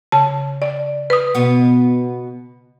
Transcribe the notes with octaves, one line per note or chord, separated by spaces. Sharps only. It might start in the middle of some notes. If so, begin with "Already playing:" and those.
C#3 A5
D5
B4 D#6
B2 B3